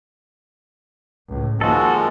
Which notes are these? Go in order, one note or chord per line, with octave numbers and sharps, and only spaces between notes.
C#2 A2
D#3 F3 G#3 A#3 F#4 A4